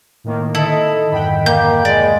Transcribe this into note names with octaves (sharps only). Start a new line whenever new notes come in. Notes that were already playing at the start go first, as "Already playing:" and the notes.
A2 D#3 A#3
D3 D#3 C4 E4 A4 D#5
C2 F2 G#2 F#5 G5 B5
A#3 G6
G#3 D5